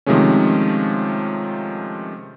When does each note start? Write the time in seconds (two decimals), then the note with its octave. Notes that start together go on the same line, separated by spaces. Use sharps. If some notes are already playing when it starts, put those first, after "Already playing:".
0.06 C3 D#3 F3 G#3 A3 C#4